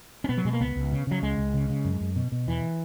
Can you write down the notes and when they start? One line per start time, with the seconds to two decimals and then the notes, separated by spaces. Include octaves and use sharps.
0.24 C#4
0.29 B2 B3
0.37 F#3
0.45 B2 G#3
0.53 A#3
0.60 C#2 B3
0.76 C#2
0.92 C#3
1.07 C#3 F#3
1.22 C#2 G#3
1.38 C#2
1.54 C#3
1.69 C#3
1.85 F#2
2.01 F#2
2.16 B2
2.32 B2
2.47 E2 E3